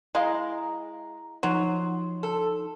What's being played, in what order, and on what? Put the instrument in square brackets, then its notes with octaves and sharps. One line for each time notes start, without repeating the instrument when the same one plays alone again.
[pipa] G#3 [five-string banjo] E4 D#5 F5 [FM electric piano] A#5
[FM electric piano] F3 D#4 C6 [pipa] F#3
[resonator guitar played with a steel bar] A4